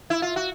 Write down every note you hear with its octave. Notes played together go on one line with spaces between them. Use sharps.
E4
F4
F#4